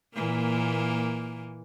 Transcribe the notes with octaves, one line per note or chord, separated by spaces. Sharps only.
A#2 E3 A#3